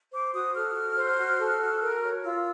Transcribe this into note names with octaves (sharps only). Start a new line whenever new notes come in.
C5 D6
F#4 D#6
A4 F6
F#4
C5
F#4
A4
F#4
A#4
C#5
F4 E6